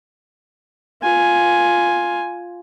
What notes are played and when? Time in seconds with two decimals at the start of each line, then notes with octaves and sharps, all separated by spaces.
1.02 F4 G#5